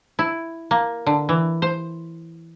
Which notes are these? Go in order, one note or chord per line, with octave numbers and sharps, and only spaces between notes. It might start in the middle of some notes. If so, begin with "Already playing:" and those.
E4
A#3
D3
E3
C5